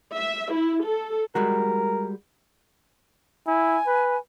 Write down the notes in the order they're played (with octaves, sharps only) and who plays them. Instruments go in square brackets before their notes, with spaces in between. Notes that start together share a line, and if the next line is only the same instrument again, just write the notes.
[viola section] E5
E4
A4
[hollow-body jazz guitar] G3 G#3 F#4 [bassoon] A#4
[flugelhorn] E4 [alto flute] G#5
[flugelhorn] B4